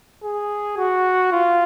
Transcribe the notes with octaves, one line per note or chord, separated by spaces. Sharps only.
G#4
F#4
F4